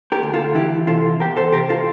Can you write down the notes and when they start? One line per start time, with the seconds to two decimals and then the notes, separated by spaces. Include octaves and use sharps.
0.12 G4 A#4
0.23 D2
0.34 F4 A4
0.55 E3 E4 G4
0.87 C3 F4 A4
1.20 E2 G4 A#4
1.37 A4 C5
1.52 C3 G4 A#4
1.69 F4 A4